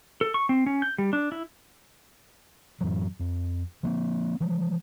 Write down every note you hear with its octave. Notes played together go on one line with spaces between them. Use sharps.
A4
C#6
C4
C#4
G6
G3
D4
E4
F#2 A2 E3 F#3
F2
F3 A#3 C4
E3 F3 G#3